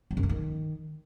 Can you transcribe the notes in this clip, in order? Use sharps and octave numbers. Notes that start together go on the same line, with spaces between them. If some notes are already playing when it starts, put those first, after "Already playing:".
F#3
F#2
A3
D#3